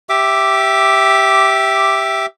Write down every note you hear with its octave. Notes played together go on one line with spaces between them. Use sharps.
G4 E5 D6